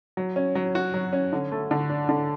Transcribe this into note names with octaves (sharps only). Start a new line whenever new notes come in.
F#3
C#4
F#3
F#4
F#3
C#4
D3
A3
D3
D4
D3